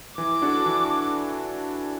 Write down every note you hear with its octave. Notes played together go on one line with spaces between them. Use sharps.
E3 D6
D4 F#4 A4
E3